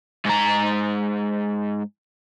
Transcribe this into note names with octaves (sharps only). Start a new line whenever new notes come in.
G#2 A#5